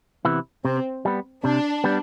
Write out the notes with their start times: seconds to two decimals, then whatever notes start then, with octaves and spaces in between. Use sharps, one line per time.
0.25 C3 E3 B3 E4
0.65 C3 C4
1.05 G3 B3
1.44 C3 D4
1.84 G3 B3